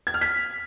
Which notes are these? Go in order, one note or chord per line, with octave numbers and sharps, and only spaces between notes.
G#6
F6
B6